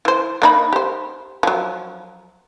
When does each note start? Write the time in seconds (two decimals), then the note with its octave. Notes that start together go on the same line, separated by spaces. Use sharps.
0.05 E3 C5
0.42 A#3 D#4 B5
0.73 G4 C5
1.43 F3 F#3